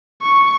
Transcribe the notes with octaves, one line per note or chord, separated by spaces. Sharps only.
C#6